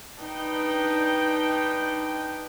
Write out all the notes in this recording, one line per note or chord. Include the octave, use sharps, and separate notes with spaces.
D4 D#4 B4 G5